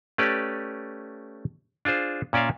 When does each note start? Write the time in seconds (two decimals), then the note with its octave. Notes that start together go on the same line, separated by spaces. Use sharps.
0.18 A3 C#4 G4 B4 D5
1.85 D4 F4 G#4 C5
2.33 A#2 C#4 D5 E5 F5